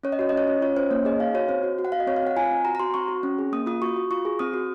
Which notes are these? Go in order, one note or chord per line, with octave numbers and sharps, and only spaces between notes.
C#4 C#5
D#5
F#4 C#5
C#4 D#5
C#5
C#4
F4 C#5
C#4 C5
A#3 C#5
G#4 D#5
D#4 F5
F#4 C#5
C4 C5
F#4
F#4
F#5
F#4 F5
D#5
C4 C#5
F5
C4 F#5
F4 G#5
C4
F#4 A#5
A#5
F#4 C6
C4 C#6
F#4
C#4
G#4
A#3 D#6
F4 D#6
F#4 C#6
F#4
F4 C#6
G#4
C4 D#6
F#4